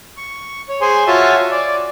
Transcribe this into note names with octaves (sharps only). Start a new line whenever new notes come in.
C#6
C#5
G#4 C5 G#5 C6
F4 F#4 C#5 E5 G#5 A5
D5